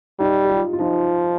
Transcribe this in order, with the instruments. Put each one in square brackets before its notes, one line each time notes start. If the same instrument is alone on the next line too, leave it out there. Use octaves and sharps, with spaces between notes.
[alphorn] G3 [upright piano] D#4
[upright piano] G4
F4
F4
[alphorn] F3 [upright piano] D#4